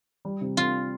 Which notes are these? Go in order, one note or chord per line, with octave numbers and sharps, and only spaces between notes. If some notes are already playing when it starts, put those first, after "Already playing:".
G3
C3
C4 F4